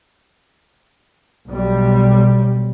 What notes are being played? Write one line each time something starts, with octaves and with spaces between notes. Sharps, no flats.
B1 G3